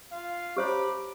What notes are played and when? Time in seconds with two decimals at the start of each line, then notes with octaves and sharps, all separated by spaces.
0.11 F4 F5
0.57 G4 C5 C#5 A#5 B5 D6